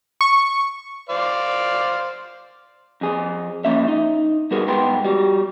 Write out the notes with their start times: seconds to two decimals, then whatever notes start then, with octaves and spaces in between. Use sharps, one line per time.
0.21 C#6
1.09 C5 D5 F5
3.01 F2 G#4
3.65 F3 A#3 C#4 E5
3.88 D#4
4.51 G3 B3 F#4 G#4 A#4
4.68 G#2 B3 B4 G5 C6
5.05 G3 F#4